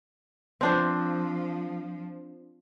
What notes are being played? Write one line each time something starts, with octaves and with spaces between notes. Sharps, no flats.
F3 C4 D4 C5